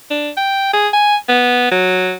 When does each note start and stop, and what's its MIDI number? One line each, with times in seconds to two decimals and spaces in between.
0.10 0.30 62
0.37 0.70 79
0.73 0.88 68
0.93 1.16 80
1.29 1.67 59
1.71 2.14 54